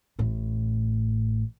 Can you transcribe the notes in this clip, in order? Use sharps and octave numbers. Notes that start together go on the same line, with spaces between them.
A1 A2